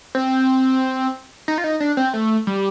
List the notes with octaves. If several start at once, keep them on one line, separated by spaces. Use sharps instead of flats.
C4
D#4
F4
D#4
D4
C4
A3
G3